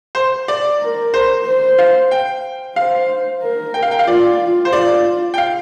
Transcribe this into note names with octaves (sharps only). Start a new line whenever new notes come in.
C5
D5
A#4
C5
C5
F5
G5
C5 F5
A#4
G5
F5
G5
F5
F4 D5
C5
F4 D5
G5
F5